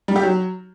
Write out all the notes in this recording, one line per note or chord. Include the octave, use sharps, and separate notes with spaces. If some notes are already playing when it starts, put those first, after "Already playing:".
G3
G4
F#3